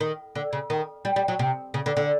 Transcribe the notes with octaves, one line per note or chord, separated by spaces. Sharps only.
D#3
D3
C#3
D#3
G3
G3
F#3
C3
C#3
D3
D3